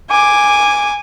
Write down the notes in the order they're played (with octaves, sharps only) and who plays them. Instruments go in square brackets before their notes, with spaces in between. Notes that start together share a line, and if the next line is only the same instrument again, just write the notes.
[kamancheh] G#5 D6